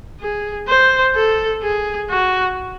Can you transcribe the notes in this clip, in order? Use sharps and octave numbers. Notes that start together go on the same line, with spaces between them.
G#4
C5
A4
G#4
F#4